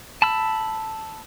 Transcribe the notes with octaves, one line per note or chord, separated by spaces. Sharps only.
A5 B5 E6